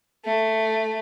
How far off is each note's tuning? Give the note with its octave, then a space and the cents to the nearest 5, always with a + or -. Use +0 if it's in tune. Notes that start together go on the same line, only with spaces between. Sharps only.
A3 +5